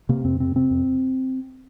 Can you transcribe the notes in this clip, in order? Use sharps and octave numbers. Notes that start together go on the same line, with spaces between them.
C3 A#3
F2 C4
C3 C4
C3 C4
F2